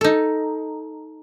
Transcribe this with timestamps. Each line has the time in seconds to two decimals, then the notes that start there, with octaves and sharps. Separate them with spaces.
0.01 D#4 A4